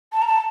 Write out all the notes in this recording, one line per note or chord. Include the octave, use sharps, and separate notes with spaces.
A5
A#5
A5